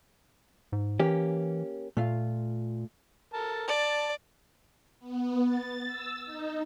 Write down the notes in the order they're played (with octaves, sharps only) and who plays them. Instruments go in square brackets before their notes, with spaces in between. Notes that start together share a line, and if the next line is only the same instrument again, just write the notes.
[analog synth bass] G#2
[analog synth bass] E3 [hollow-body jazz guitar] A#3 C#4 G4
[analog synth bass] A#2 [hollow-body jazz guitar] A3 F4 F5
[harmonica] A4 A#4 A5
[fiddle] D5 [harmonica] A5
[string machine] B3
A6
E6
D#4